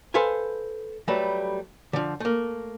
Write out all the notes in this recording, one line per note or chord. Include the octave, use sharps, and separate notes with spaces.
A4 B4 C5 F5 G#5
F#3 G3 A3 A4 B4
D3 F3
A3 A#3